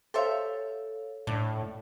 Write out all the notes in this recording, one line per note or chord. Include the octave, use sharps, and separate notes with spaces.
G4 A4 C5 C#5 E5 F5
A2 D4